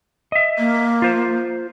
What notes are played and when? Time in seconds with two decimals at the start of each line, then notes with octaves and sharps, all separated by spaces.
0.32 D#5 E5
0.59 A#3
1.02 F4 C5